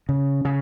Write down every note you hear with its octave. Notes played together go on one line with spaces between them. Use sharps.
C#3
C#3